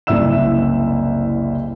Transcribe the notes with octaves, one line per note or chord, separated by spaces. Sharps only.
F#1 C2 E4 E5 E6 E7